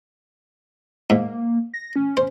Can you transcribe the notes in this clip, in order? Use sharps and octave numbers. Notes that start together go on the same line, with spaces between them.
G#2 A#3
A#6
C#4
C5